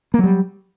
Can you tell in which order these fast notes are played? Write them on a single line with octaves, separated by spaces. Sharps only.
A#3 F#3 G3